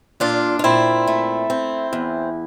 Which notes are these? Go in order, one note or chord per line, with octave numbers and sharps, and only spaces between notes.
A#2 D4 F4
F4
A#2 C4 E4
A3
C4
E2